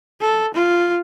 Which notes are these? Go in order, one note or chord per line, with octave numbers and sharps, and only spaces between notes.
A4
F4